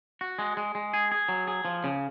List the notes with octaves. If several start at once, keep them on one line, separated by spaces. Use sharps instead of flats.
F#4
G#3
G#3
G#3
G#4
G#4
F#3
G#4
F3
C#3